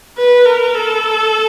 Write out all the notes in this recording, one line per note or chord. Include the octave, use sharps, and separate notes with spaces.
B4
A#4
A4